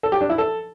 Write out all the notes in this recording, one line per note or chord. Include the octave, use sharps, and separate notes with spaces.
A4
G4
D4
E4
A4